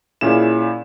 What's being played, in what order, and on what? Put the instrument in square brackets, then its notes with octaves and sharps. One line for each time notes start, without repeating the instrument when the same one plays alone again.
[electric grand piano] A#2 C#4 E4 G#4 E7